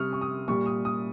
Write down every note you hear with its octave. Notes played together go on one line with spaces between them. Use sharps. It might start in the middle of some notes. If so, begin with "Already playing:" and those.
Already playing: C3 G3 C#6 D#6 F6
C#6
D#6
A#2 G3 C#6
D#6
D#6